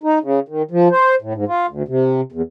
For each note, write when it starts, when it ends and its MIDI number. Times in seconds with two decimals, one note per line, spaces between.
0.03 0.19 63
0.23 0.40 49
0.48 0.62 51
0.71 0.88 53
0.91 1.15 72
1.22 1.33 45
1.35 1.45 44
1.48 1.66 65
1.69 1.83 38
1.88 2.21 48
2.32 2.42 40